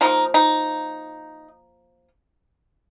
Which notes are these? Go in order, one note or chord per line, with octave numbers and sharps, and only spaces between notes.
F3 A#3 D#4
D#4